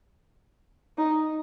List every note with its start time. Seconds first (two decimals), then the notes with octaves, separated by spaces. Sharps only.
0.98 D#4